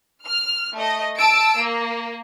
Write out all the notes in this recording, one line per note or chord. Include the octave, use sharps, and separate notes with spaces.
F6
A3 D#5
A5 E6 D7
A#3